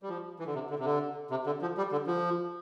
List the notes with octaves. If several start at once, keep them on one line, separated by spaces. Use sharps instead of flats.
G3
F3
E3
D3
C3
D3
C3
D3
C3
D3
F3
G3
D3
F3